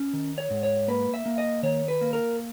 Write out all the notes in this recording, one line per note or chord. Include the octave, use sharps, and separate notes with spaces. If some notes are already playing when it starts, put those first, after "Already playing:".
Already playing: C#4
D#3
C#5
G#2
C#5
A#3 B4
E5
A#3
D#5
D#3 C#5
B4
A#3
A#4